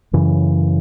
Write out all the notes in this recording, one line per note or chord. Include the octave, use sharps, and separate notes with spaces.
F#2 C#3 E3